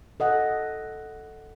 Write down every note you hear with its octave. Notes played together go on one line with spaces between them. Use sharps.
A4 D#5 F#5